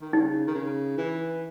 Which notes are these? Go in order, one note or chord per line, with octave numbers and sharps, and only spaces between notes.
D#3
C#3 D#4
D#3
C#3
E3